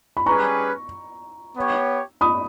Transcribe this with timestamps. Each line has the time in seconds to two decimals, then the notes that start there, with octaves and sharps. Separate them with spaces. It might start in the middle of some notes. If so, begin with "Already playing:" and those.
0.17 B5
0.26 G3 C#4 G#4 B4 A#5 C#6
1.56 B3 G4 C#5
2.21 B5 D#6